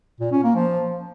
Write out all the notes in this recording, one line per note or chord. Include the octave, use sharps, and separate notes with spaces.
A#2
C#4
A#3
F3